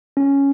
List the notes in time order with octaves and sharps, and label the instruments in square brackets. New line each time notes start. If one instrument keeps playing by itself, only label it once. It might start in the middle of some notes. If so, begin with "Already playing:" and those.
[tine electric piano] C#4